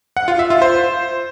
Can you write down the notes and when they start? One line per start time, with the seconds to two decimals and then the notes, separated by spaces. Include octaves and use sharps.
0.17 F#5
0.28 F4
0.39 E5
0.50 F4
0.62 C5